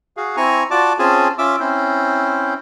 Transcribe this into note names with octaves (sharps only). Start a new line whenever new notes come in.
F#4 G#4 F5
C4 E4 G#5 A#5 C#6
F4 F#4 D5 A5 D6
C4 C#4 F4 G#4 G#5 A5
C#4 F4 E5 D6 E6
C4 C#4 E4 C5